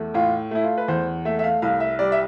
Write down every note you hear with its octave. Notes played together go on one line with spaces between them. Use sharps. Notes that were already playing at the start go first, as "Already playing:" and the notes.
Already playing: E2 A3
A2 F4
A3 E4
F4
B4
E2 C5
A3 E5
E5
F5
C2 F5
E5
G3 D5
E5